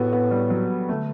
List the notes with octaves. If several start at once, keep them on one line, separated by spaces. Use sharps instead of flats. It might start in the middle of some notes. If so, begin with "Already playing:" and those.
Already playing: A2 B3 F#4 G4 A4
B3
G3
F#3
D3 A3